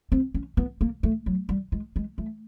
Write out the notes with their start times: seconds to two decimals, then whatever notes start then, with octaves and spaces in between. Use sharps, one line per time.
0.12 C4
0.34 C#4
0.57 B3
0.81 A#3
1.03 A3
1.26 F#3
1.49 G3
1.72 G#3
1.96 G#3
2.18 A3